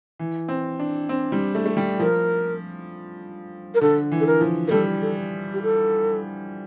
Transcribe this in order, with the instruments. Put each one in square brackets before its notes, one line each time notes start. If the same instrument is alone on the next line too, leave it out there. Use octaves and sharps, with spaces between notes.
[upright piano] E3
C4
D4
C4
G3
A3
A3
G3
[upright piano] F3 [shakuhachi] A#4
[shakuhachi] A#4
[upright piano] D3 [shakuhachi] A4
[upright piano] E3
[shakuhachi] A4
A#4
[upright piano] F3
[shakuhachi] A#4
[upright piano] G3 [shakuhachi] A4
[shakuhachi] A4
G4
A4